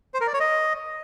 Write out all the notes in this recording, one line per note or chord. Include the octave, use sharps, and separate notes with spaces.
C5
A#4
D5
C#5
D#5